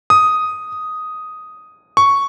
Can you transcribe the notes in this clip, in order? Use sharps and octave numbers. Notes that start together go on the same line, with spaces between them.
D#6
C#6